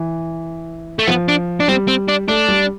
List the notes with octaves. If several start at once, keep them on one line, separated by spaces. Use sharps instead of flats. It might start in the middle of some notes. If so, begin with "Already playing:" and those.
Already playing: E3
A3
F3 B3
D4
D4
G3 C4
C4
D4
A3 D4
G3